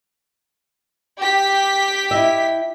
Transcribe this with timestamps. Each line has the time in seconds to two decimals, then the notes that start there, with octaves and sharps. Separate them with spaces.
1.19 G4 B6
2.11 E4 D#5 E5